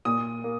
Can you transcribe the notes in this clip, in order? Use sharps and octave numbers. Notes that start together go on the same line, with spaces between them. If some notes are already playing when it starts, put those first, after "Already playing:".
A#2 D#6
A#3